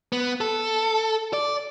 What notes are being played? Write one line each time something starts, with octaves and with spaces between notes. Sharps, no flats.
B3
A4
D5